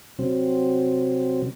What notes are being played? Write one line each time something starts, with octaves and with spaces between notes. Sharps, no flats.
C3 F#3 C4